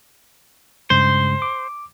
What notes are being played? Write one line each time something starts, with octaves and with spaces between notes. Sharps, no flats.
G2 C#3 G#3 C5
D6